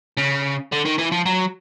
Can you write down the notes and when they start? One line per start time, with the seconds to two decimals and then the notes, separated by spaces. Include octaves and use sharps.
0.18 C#3
0.72 D3
0.85 D#3
0.98 E3
1.12 F3
1.26 F#3